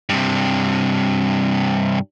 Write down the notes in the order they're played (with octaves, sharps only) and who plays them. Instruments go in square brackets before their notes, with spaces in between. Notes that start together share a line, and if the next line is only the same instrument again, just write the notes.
[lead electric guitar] G2 C3